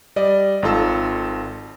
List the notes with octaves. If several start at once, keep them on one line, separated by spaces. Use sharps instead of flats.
G3 D5 D#5
G#1 D#4 F4 A4 E6